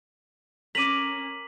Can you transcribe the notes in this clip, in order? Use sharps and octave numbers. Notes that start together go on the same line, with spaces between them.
C#4 A#4 D6 B6 D#7 F7 F#7